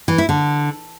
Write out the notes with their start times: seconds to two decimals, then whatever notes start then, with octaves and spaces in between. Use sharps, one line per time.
0.08 E3
0.18 E4
0.29 D3